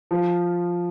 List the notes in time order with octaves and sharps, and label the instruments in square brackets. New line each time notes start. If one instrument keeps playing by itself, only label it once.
[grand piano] F3